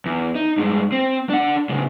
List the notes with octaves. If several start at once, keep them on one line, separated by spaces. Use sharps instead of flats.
E2
D#4
G2 G#3
C4
D4 F#5
A2 C#3